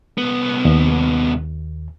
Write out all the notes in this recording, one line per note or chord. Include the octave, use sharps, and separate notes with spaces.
C2 B3
D#2